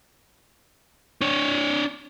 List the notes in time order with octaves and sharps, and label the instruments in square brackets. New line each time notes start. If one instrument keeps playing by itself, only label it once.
[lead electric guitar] D4 C#5